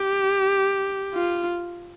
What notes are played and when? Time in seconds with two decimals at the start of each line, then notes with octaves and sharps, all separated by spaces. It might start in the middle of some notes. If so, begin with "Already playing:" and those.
Already playing: G4
1.14 F4